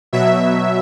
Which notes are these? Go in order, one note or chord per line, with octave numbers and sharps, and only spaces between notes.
B2 F#3 E5